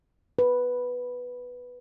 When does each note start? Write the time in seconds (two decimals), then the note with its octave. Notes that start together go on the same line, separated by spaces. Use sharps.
0.39 B4